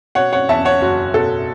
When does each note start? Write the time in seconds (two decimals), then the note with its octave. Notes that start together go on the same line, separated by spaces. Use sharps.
0.15 B2 C#5 F#5
0.33 C#5 F#5
0.49 E2 E5 A5
0.65 C#5 F#5
0.81 F#1 F#4
1.14 B2 A4